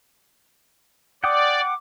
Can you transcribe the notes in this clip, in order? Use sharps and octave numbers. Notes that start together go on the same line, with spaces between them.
D5 F#5 G5 D6 D#6